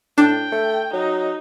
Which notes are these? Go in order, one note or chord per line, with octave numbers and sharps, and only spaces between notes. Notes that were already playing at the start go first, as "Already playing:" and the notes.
A2 D4 G5
A3
F#3 D#4